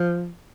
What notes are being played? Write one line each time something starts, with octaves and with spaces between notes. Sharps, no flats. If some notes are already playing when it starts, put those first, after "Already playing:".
Already playing: F3